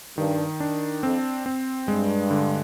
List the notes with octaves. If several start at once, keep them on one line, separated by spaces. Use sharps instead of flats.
G2 D#3
D4
F2 C4
C4
G2 G#3
D3